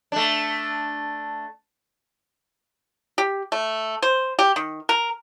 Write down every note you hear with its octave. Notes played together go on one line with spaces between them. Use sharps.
A3 D4
G4
A3
C5
G4
D#3
A#4